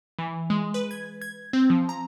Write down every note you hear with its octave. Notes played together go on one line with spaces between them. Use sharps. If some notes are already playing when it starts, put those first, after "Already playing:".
E3
G#3
B4
G#6
G#6
C4
F3
A#5